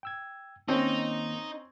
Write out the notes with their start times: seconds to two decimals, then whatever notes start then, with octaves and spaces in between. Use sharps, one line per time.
0.03 G5 E6 G#6
0.68 D#3 A#3 C4 C#4 D#4